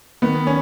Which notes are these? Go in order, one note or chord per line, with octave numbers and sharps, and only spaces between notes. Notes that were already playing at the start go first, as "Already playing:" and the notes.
D#3 B3
C#4